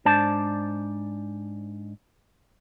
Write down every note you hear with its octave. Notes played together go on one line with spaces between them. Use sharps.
G#2 D4 C5 D5 A5